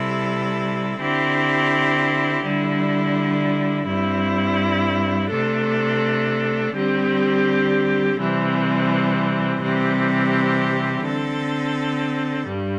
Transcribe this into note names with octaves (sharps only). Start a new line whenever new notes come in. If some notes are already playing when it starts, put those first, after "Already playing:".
Already playing: C3 G3 E4 A4
D3 C4 E4 G4
D3 G3 E4
G2 G3 C4 E4
C3 A3 D4 A4
D3 G3 C4 G4
C3 E3 G3 C4
C3 E3 G3 C4 G4
D3 C4 A4
G2 G3